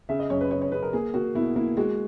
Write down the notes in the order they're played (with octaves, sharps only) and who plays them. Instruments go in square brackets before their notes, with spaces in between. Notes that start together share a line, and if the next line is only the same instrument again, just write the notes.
[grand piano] C#3 E5
D#5
F#2 C#5
B4
C#3 C#5
C#5
C#3 B4
A#4
A#3 G#4
A#3 F#4
B2 E4
A#3 E4
G#3 F#4